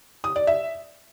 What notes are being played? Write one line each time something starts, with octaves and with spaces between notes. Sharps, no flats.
D#6
D5
E5